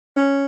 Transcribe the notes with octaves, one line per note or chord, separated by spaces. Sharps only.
C#4